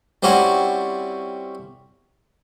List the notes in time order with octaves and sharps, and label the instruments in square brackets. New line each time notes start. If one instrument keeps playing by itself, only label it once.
[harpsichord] G3 C4 C#4 E4 F#4